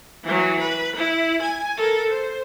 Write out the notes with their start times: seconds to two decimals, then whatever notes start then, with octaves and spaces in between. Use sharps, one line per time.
0.24 E3 F#3
0.60 B4
0.96 E4
1.42 G#5
1.78 A4 A#4
2.09 C5